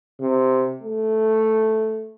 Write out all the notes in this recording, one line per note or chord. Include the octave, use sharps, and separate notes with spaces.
C3
A3